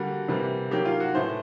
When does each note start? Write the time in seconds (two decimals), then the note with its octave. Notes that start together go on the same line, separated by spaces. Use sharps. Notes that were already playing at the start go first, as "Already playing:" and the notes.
Already playing: D3 G3 A#3 F#4
0.28 C3 E3 G3 A#3
0.71 D#3 F#3 A#3 G4
0.85 F4
1.00 F#4
1.15 A2 E3 A3 C5